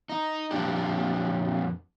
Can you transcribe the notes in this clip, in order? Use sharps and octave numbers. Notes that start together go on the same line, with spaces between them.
D#4
F2 A#2 D4 G4